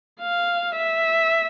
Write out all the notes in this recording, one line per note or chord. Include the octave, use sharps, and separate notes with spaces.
F5
E5